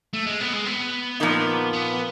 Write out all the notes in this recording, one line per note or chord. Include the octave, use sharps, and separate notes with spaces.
A3
G#3
B3
G#3
B3
A#2 F3 A#3 D#4
B3